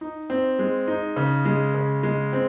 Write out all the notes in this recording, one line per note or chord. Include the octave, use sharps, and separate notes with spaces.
D#4
C4
G#3
D#4
C#3
G#3
C#3
G#3
C4